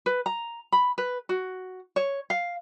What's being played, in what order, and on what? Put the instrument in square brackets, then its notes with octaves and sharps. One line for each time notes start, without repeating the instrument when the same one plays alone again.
[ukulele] B4
A#5
B5
B4
F#4
C#5
F5